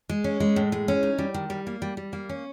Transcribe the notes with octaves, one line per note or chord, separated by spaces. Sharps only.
G#3
C#4
G#3
A2
G#3
C#4
D#4
G3
D#3
G3
A#3
G3
G3
A#3
C#4